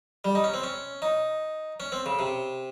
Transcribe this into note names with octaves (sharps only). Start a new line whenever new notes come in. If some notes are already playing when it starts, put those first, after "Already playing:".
G3
D#4
C#4
C4
C#4
D#4
C#4
C4
C#3
C3